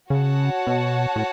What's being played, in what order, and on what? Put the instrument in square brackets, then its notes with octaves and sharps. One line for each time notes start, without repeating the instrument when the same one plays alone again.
[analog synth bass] C#3 [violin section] F#4 C#5 F#5 A5
[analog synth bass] B2
A2